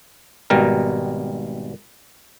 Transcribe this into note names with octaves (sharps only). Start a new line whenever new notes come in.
G#1 B2 G3 A#4